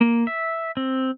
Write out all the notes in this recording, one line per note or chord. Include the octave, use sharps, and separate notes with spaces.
A#3
E5
C4